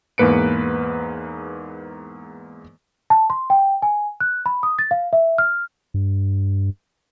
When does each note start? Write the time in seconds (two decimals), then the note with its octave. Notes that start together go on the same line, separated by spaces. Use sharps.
0.18 E2 G#2 A#3 B4 C#7 D7
3.10 A5
3.30 C6
3.50 G5
3.82 G#5
4.20 F#6
4.46 B5
4.63 D#6
4.79 A6
4.91 F5
5.13 E5
5.38 F6
5.94 G2